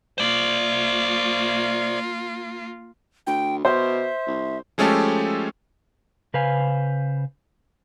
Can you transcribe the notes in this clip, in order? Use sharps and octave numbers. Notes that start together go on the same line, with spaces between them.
A#3 F4 C5 D5
D2 G5
B2 C5 E5
C2
F3 G#3 A3 C#4 G4 A4
C#3 B4 C5 F5 G#5